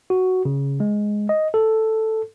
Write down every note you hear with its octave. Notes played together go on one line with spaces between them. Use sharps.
F#4
C#3
G#3
D#5
A4